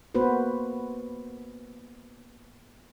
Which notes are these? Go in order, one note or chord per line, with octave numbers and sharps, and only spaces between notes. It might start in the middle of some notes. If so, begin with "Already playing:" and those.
A#3 B3 F#4 B4 C5